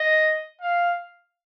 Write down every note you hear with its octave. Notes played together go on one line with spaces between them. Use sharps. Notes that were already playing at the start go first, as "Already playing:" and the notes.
Already playing: D#5
F5